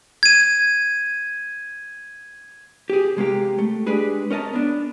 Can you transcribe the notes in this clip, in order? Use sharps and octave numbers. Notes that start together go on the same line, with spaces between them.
G#6 D#7
G4 G#4
C3 G#3 A#3 G4
A3
G#3 D4 G4 G#4 B4
C#4 A#4 D#5 A5
B3 D4